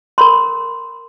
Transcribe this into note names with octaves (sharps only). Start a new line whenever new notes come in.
A#4 B5 C6